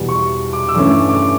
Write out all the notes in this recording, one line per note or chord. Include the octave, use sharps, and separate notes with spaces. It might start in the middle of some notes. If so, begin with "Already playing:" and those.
Already playing: E2 B2 G3 B3
C#6
D6
E6
G2 E3 A3 C#4 D6
D6